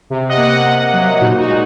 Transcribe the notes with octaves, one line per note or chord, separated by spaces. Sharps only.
C3
D#5 F#5
A#3
D#5 F#5
C3
F#3
A#2 D#4 F#4
D#4 F#4
G#3